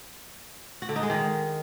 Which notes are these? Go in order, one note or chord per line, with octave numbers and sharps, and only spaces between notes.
F#4
D3
D#4
G#3
D#3